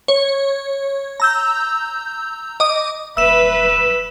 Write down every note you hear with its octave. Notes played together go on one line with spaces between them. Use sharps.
C#5
A#5 E6 G6
D#5 D6 D#6
D#1 B4 E5 E6 E7